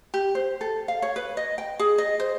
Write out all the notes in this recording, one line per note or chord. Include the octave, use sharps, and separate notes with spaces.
G4
C5
A4
F5
C#5
B4
D#5
G5
G#4
D#5
C5